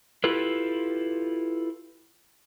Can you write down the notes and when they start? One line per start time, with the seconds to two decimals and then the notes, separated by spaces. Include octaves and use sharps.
0.24 E4 F4 G4 A4 B4